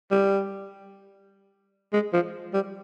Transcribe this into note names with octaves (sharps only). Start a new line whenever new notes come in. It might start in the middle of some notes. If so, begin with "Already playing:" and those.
G3
G#3
F3
G3